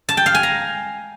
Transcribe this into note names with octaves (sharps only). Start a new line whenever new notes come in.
A5
G5
F5
G#5
A#5